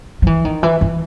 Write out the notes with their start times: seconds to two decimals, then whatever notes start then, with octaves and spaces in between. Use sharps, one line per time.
0.22 F3
0.27 E3
0.45 D#3
0.63 E3
0.81 E3